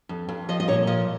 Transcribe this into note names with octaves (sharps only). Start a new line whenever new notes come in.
F2
F2
F3 D#5
D#5
A#2 C#5
F3 D#5